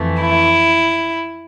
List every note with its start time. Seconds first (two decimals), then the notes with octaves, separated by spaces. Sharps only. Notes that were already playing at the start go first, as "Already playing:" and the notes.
Already playing: F2 E3 A3
0.21 E4